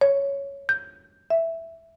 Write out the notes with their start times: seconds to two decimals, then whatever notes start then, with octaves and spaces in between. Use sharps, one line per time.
0.01 C#5
0.69 G6
1.30 E5